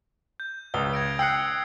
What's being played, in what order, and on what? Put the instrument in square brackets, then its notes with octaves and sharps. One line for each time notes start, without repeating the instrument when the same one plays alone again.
[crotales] G6
[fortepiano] C#2 [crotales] D#6 G7
[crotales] G#6 A#6 D7
[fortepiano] G5 F#6 [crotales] E6 C7 C#7